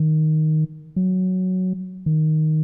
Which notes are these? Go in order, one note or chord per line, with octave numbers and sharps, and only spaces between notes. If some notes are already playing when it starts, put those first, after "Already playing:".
Already playing: D#3
F#3
D#3